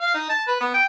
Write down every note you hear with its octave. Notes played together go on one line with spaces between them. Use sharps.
F5
D#4
A5
B4
B3
G5